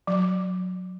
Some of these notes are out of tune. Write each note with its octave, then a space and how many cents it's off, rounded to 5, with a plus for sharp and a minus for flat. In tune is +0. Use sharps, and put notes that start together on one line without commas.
F#3 -15